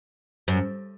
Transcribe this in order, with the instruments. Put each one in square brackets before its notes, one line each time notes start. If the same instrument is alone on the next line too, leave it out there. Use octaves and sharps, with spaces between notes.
[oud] F#2